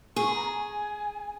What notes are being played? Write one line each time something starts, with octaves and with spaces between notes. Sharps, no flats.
G#4 C#6
B5
A#5
G#5